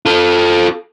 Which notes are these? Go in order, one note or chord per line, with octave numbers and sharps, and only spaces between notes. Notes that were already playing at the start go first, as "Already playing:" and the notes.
F4 A4